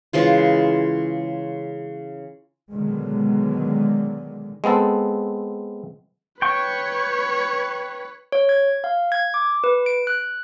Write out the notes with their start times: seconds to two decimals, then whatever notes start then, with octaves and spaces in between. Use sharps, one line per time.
0.13 C#3 E3 G#3 F4
2.73 B2 D3 D#3 F#3 G#3
4.64 G#3 B3 C4 A4
6.42 B4 C#5 G5 C#6
8.32 C#5
8.49 G#6
8.84 F5
9.12 G#6
9.34 D6
9.64 B4
9.86 D7
10.07 F#6